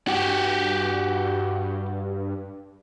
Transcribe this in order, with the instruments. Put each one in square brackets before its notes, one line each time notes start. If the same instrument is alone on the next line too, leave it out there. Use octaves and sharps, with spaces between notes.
[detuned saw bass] G2 [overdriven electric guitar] F#4 G4